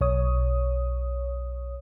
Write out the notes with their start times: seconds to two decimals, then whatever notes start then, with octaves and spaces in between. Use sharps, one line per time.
0.01 B1 C#5 D#6